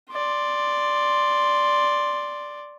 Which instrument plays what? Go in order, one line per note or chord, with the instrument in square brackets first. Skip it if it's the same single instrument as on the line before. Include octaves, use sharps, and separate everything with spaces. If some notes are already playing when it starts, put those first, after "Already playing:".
[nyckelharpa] D5 C6